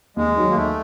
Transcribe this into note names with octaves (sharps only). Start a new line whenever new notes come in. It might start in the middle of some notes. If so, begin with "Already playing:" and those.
D#2 G#3
D#3 F#3
A#3
D#2 A3